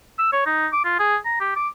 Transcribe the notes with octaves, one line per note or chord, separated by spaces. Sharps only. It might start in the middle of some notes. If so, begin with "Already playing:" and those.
E6
C#5
D#4
D6
F4
G#4
A#5
G4
D6